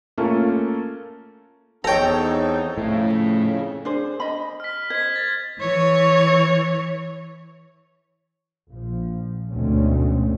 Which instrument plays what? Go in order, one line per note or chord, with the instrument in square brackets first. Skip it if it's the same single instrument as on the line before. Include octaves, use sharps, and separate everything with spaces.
[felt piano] A3 A#3 C#4 F4 A4
[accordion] E2 C4 D#4 [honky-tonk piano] A4 C#5 [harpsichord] G5 A#5
[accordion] F2 C#3 [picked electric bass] A2
[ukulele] D4 G#4 C5
D#5 B5
[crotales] F6 B6
[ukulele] C5 D#5 [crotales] G#6 B6
[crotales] A6
[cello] E3 C#5
[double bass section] A#1 F3
D2 G#2 B2 A3 C4 C#4